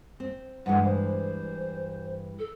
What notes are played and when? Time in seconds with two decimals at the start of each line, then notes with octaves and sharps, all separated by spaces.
0.20 C4
0.66 G2 E3 G#3 F#5
0.85 C5
2.39 A4